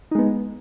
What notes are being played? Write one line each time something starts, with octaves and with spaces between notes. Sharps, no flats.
G#3 B3 D#4